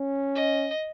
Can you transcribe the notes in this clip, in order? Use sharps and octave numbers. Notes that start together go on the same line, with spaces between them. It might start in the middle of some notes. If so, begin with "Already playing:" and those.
Already playing: C#4
D#5